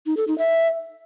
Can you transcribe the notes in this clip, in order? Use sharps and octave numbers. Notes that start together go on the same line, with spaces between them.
D#4
A4
D#4
E5